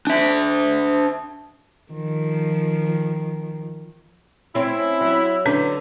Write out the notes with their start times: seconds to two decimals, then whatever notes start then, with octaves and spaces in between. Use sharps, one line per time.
0.07 D4 E5
1.92 D#3 F3
4.55 C4 C#4 E4
5.01 F#3
5.46 D3 C#4 D4 B4